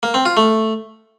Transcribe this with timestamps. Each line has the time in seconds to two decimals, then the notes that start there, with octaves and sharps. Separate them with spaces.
0.03 A#3
0.14 C4
0.25 F4
0.37 A3